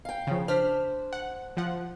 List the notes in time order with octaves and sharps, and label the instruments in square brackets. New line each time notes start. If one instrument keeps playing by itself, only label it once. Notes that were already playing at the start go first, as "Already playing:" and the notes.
[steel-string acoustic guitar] F5 G5
[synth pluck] C#3 F3
[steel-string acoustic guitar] D4 C5 [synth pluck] F6 B6
[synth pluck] F#5
F3 F#5